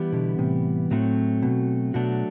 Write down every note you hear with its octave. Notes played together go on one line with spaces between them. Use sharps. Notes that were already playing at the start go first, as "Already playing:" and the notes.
Already playing: E3 G3 B3 E4 G4
B2 D3
A2 C3
A2 F#3 A3 C4 F#4
B2
B2 F#3 A3 D4 F#4